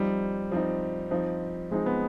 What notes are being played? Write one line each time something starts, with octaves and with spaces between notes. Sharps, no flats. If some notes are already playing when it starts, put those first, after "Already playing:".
Already playing: F3 G3 C4 D#4
F3 C4 D#4
F3 C4 D#4
F3 G#3 C4 D#4
B3